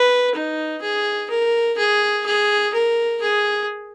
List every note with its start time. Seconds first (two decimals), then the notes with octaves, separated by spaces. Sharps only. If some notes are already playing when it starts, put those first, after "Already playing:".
Already playing: B4
0.34 D#4
0.82 G#4
1.30 A#4
1.78 G#4
2.26 G#4
2.74 A#4
3.21 G#4